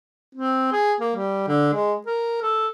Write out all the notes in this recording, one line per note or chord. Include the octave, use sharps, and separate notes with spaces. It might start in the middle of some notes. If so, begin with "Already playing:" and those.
C4
G#4
A#3
G3
D3
G#3
A#4
A4